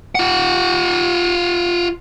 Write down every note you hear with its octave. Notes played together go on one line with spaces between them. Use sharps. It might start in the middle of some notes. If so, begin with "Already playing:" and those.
F4 F#5